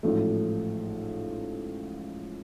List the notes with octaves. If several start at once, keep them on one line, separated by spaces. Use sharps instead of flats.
A1 G#2 F3 A3